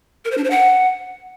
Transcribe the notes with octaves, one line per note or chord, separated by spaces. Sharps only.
A#4
C5
D4
C5
F#5